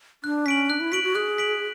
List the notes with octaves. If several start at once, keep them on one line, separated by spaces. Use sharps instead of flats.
D4 F#6
C#4 B6 D7 F#7
D4 F#6
E4
F#4 B6 D7 F#7
F#4
G#4 F#6
B6 D7 F#7